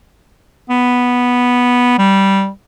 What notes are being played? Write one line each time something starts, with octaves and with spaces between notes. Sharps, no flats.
B3
G3